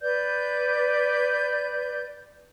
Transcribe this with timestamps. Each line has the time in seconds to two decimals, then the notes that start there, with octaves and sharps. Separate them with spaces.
0.02 B4 D5 G6